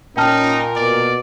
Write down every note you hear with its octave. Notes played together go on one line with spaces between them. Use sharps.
A#2 C#4 D#4 A#4 G5 A5 F6
B2 D5